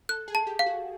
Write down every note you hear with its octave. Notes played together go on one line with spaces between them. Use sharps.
A4 F#6
G#4
A5
G4
F5
F#4